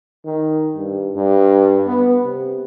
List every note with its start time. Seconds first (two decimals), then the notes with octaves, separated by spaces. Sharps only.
0.25 D#3
0.76 G2
1.15 G2
1.87 B3
2.24 C3